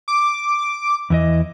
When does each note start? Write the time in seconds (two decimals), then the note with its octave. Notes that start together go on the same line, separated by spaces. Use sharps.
0.08 D6
1.10 E2 E3 D#5